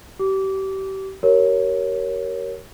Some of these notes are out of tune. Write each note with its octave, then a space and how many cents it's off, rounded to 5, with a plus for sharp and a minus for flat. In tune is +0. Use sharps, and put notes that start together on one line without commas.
G4 -30 D6 -20
G4 -40 A#4 +0 C#5 +0